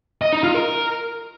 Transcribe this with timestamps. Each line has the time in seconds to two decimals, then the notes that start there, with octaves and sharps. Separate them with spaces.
0.22 D#5
0.33 D#4
0.43 F4
0.54 A#4